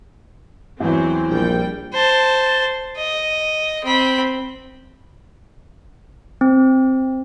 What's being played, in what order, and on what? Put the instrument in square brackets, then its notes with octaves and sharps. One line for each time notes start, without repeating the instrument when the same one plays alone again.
[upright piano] E2 E3 [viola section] F#3 C4 C5
[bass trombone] A#1 [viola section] G3 G5
[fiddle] C5 A5
D#5
C4 B5
[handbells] C4